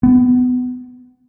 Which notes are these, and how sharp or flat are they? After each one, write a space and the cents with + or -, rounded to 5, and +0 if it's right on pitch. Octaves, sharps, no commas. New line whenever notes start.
B3 +20